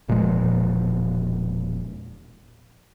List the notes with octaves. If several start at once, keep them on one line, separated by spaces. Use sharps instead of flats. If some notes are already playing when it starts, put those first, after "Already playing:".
E1 A#2 F3 G#3